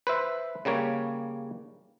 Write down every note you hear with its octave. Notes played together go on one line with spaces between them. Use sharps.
B4 C5 E5
C#3 G3 A#3 C#5